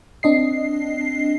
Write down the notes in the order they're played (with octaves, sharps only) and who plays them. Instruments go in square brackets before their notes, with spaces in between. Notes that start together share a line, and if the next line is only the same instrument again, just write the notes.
[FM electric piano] C4 D4 D#5 C7